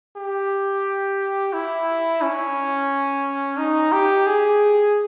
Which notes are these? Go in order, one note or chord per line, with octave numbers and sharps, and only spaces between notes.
G4
E4
C#4
D#4
G4
G#4